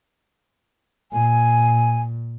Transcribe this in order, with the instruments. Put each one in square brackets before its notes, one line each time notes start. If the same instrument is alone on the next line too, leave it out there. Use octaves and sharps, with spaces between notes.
[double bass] A#2 [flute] G#5